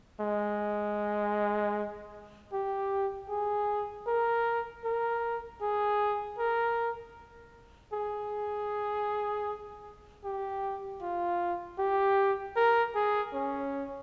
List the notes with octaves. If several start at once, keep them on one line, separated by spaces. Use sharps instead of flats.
G#3
G4
G#4
A#4
A#4
G#4
A#4
G#4
G4
F4
G4
A#4
G#4
C#4